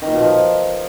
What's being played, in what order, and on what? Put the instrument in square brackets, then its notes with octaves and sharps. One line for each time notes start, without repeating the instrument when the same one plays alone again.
[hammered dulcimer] D#3
A#2
B2
F3